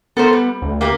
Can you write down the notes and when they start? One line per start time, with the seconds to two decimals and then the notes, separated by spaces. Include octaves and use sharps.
0.17 B3 A4 A#4 C5
0.33 G3
0.62 D2
0.81 A#3 G4 A#4